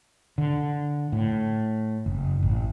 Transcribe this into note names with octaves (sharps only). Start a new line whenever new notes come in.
D3
A2
F#1
A1